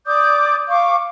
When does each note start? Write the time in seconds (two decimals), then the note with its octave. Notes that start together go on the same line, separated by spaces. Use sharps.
0.06 D5 D6 D#6 G6
0.68 F5 C#6 D6